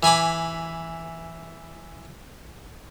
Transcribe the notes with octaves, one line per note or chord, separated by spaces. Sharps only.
E3 G#5 B5 D6